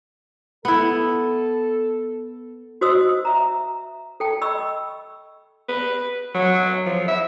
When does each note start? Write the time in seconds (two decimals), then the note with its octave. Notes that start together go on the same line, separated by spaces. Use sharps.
0.65 B3 E4 A4
2.81 F#4 C5 D#5 D#6 E6
3.25 E5 A#5
4.20 A4 G5 A5
4.41 D#5 B5 C#6 E6
5.69 B4
6.35 F#3
6.86 F3
7.08 E5